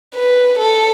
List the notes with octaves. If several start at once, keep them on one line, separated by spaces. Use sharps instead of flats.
B4
A4